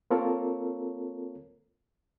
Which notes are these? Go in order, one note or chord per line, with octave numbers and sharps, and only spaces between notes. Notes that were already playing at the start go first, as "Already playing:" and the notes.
A#3 C4 F4 A4 A#4 C#5